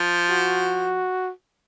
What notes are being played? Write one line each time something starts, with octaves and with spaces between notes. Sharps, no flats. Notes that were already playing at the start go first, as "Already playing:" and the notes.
Already playing: F3
F#4